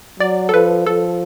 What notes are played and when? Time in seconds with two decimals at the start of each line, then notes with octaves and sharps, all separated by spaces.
0.19 F#3 D5
0.49 A4
0.53 F3 B4
0.86 F3 A4